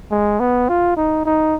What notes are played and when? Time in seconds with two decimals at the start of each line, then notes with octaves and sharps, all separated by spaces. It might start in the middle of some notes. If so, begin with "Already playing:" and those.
0.11 G#3
0.40 B3
0.68 F4
0.97 D#4
1.25 D#4